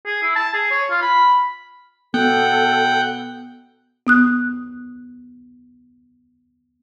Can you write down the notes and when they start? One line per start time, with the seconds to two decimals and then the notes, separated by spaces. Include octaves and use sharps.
0.06 G#4
0.23 E4
0.36 A5
0.54 G#4
0.71 C#5
0.90 F4
1.02 B5
2.14 B2 B3 A4 F#5 G5
4.07 B3 D#6 F#6